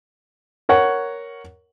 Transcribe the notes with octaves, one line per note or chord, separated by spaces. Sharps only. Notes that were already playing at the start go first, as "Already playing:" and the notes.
A#4 C#5 F#5